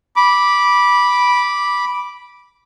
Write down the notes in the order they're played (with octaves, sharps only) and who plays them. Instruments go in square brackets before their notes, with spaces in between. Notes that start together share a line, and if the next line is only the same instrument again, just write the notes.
[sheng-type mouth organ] B5 D6